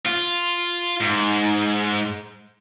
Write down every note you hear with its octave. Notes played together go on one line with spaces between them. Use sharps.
F4
G#2